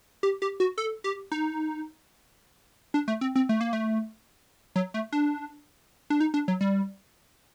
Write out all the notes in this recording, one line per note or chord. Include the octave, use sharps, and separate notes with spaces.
G4
G4
F#4
A4
G4
D#4
D4
A3
C4
C4
A3
A#3
A3
F#3
A3
D4
D4
D#4
D4
F#3
G3